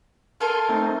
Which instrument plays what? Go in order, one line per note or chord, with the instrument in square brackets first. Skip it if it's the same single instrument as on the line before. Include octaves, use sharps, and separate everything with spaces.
[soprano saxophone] A4 [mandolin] A#4 F5 [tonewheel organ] G#5 C6
[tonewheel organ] A3 C4 D#4